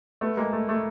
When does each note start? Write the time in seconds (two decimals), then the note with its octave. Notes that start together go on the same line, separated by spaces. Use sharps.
0.21 A3 B3
0.37 G#3 A#3
0.53 A3
0.69 A3